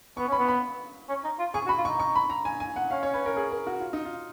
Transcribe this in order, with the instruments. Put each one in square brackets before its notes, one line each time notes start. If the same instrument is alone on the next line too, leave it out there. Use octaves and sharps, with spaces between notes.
[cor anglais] B3 [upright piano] C#6
[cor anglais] C#4 [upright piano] B5
[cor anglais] B3
[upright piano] B5
[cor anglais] C#4
D#4
F4
[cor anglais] G#4 [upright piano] C#6
[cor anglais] F#4
[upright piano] B5
[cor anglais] F4
[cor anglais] D#4 [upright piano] C#6
[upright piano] C#6
B5
A#5
G#5
G#5
F#5
[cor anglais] C#4 [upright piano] F5
[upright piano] C#5
B4
A#4
G#4
A#4
F#4
F4
D#4
F4